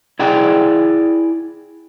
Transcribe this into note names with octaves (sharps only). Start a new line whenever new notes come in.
E4 G#4 D5 F#5 G5